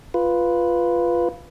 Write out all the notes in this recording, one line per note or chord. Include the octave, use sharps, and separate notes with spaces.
F4 B4